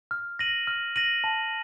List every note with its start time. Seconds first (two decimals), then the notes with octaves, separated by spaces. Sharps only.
0.11 F6
0.39 A#6 D#7 F#7
0.67 F6
0.96 A#6 D#7 F#7
1.24 A5